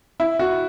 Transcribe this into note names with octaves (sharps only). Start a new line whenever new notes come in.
E4
F#4